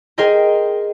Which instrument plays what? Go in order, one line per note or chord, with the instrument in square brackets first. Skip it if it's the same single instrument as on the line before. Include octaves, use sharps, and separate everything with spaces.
[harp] G#4 A#4 C5 D#5 G5